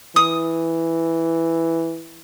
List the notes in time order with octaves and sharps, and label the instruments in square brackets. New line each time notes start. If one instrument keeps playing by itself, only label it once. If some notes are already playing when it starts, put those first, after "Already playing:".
[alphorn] E3 [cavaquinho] D#6